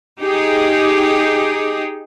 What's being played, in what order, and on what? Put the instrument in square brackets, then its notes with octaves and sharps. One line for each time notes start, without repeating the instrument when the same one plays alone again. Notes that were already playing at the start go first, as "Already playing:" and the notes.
[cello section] D#4 G4 G#4